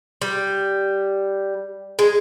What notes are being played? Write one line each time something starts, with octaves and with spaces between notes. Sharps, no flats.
G3
G#3